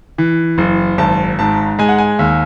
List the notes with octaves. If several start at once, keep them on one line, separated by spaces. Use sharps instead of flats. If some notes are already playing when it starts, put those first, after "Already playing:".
E3
F#1
G#1 A5
G#2 A5
G#3 G#5
F#5
G#5
D#2